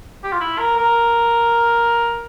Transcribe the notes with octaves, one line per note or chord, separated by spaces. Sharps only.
G4
F4
E4
A#4
A#4